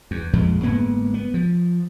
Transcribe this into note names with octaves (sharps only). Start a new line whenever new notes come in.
E2
A#1 F2 F3 G#3
G1 G#2 A#3 B3
B3
F3